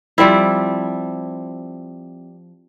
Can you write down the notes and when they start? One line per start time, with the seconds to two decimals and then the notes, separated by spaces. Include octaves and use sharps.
0.18 F3 G3 C4 E4